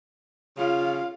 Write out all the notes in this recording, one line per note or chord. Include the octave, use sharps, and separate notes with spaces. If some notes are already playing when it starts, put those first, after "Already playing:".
C#3 F4 F5